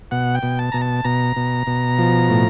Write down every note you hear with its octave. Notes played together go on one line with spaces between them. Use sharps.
B2 F#5
G5
B2
A5
B2 A#5
A5
B2 A#5
B2
B2
F3
A2